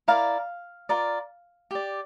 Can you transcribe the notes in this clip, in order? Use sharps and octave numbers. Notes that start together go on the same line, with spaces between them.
E4 A#4 D5 F5
F4 A#4 D5
G4 D5